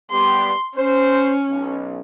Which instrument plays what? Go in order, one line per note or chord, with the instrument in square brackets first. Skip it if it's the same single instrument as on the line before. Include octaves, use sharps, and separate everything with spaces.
[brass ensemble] G3 B3 G4 [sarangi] C6
[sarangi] C#4 [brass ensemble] C5
[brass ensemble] B1